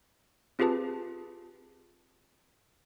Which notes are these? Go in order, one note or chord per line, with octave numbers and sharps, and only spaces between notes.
C4 F4 G4 G#4 B4 A5